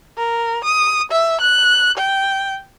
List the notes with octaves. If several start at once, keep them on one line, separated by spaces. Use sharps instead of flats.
A#4
D#6
E5
F#6
G5